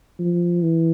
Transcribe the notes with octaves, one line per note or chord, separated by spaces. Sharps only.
F3
E3